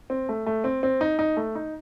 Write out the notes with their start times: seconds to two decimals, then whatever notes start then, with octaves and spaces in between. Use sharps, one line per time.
0.10 C4
0.29 A3
0.46 A3
0.64 C4
0.83 C4
1.01 D#4
1.19 D#4
1.37 A3
1.55 D#4